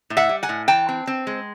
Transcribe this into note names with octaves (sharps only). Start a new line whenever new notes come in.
A2
E5 F#5
G3
F#5 G#5
A2
E3 G5 A5
C4
C4
G#3